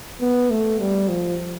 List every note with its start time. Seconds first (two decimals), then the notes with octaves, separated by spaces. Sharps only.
0.21 B3
0.50 A3
0.79 G3
1.09 F3